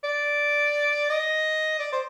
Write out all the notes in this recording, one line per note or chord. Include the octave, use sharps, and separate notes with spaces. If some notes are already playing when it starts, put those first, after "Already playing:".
D5
D#5
D5
C5